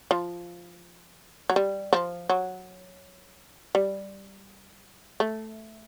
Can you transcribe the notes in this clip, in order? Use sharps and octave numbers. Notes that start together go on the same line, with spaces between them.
F3
F#3
G3
F3
F#3
G3
A3